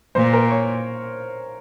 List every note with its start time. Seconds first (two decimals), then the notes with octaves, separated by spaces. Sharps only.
0.15 A#2 C5
0.33 A#4
0.50 C#5